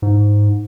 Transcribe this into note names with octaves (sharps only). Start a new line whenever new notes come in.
G#2